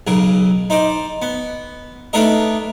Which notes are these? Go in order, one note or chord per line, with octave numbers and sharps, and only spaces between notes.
B1 C#3 A#4
D#4 C5 D5
B3
A3 B3 D4 D#4 A#4 D#5